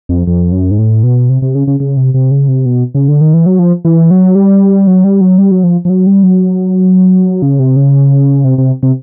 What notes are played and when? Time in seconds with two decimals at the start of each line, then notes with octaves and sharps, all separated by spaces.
0.09 F2
0.27 F2
0.52 F#2
0.71 G#2
0.78 A2
1.03 B2
1.29 C3
1.42 C3
1.55 C#3
1.67 C#3
1.80 C#3
1.97 C3
2.14 C3
2.31 C#3
2.48 C3
2.66 B2
2.95 C#3
3.08 D3
3.21 D#3
3.34 E3
3.46 F#3
3.59 F3
3.85 E3
4.11 F#3
4.35 G3
4.87 F#3
5.04 G3
5.21 F#3
5.38 G3
5.51 F#3
5.64 F3
5.85 F3
5.90 F#3
6.07 G3
6.23 F#3
7.42 C#3
7.59 C3
7.76 C#3
8.44 C3
8.58 C3
8.83 C3